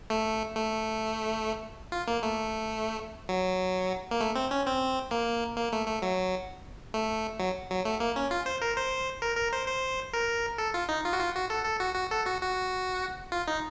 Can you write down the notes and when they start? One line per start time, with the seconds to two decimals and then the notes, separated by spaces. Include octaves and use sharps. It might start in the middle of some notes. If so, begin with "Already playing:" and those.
0.10 A3
0.56 A3
1.92 F4
2.07 A#3
2.23 A3
3.29 F#3
4.11 A#3
4.21 A3
4.36 C4
4.51 C#4
4.66 C4
5.11 A#3
5.57 A#3
5.72 A3
5.87 A3
6.02 F#3
6.94 A3
7.40 F#3
7.70 F#3
7.85 A3
8.00 A#3
8.16 C#4
8.31 F4
8.46 C5
8.62 A#4
8.77 C5
9.22 A#4
9.37 A#4
9.53 C5
9.68 C5
10.13 A#4
10.58 A4
10.74 F4
10.89 D#4
11.04 F4
11.13 F#4
11.19 F4
11.35 F#4
11.50 A4
11.65 A4
11.80 F#4
11.95 F#4
12.11 A4
12.26 F#4
12.41 F#4
13.32 F4
13.47 D#4